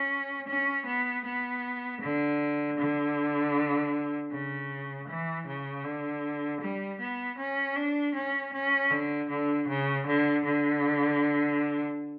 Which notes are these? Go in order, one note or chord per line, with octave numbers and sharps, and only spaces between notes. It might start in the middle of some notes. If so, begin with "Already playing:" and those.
Already playing: C#4
C#4
B3
B3
D3
D3
C#3
E3
C#3
D3
G3
B3
C#4
D4
C#4
C#4
D3
D3
C#3
D3
D3